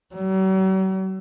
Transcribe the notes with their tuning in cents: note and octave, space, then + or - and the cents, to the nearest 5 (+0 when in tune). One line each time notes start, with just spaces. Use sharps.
F#3 +45